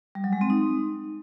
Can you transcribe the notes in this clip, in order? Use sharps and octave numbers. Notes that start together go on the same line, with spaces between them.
G3
F#3
G#3
C4
D#4